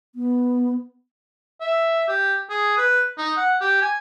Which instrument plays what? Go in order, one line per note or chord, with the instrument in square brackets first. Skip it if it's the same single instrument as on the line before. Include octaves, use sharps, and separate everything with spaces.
[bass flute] B3
[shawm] E5
G4
G#4
B4
D#4
F#5
G4
G#5